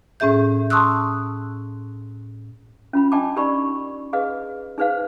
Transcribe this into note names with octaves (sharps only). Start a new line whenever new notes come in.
A2 C#4 G#4 E5 G6
A5 C6 C#6 D#6 E6 F#6
C#4 F4 B5
D4 D#5 G5 A5 D6
D#4 G4 A#4 D5 B5 C#6
G#4 B4 D#5 F5
D#4 G#4 B4 C5 F5